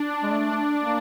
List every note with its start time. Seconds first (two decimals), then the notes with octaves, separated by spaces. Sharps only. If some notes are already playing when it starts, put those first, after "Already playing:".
Already playing: D4
0.23 G#3
0.31 A3
0.78 A#3